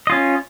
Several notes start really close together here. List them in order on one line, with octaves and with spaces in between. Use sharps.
D#5 F4 C#4